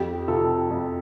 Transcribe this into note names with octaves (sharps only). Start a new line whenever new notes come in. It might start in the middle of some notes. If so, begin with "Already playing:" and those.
Already playing: F2 G4
C3 F4 A4
F2